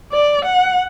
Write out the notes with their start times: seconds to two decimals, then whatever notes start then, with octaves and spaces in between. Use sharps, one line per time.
0.13 D5
0.45 F#5